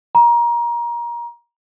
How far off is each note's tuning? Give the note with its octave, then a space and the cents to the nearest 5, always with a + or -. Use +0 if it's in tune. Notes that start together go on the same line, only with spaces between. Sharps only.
A#5 +25